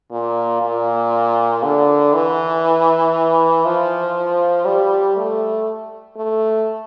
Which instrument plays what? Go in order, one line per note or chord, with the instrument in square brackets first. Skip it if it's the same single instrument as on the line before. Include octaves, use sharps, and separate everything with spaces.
[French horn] A#2
A#2
D3
E3
F3
G3
A3
A3